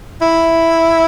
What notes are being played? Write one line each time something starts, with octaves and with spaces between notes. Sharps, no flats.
E4